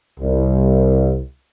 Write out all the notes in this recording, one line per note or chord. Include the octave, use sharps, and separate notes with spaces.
C2